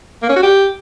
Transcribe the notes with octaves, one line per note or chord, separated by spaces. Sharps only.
A#3
C#4
F#4
G4